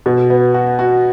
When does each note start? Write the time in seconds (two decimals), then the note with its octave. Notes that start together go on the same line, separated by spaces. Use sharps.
0.06 B2
0.30 B3
0.54 F#4
0.79 F#4